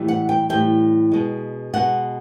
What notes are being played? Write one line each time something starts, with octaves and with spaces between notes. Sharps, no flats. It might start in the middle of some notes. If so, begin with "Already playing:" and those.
Already playing: A2 E3 G3
F#5
G5
A2 E3 G3 G5
B2 G#3
B2 G#3 F#5